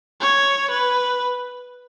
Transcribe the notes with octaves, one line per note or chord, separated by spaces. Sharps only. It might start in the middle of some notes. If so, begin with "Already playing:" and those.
C#5
B4